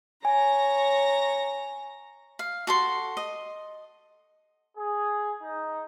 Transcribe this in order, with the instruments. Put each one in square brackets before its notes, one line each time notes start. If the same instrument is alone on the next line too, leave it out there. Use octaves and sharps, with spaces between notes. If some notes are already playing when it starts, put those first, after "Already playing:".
[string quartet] C#5 A#5 A#6 [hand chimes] G#5
[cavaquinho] F5
F#4 A4 C6
D#5
[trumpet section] G#4
D#4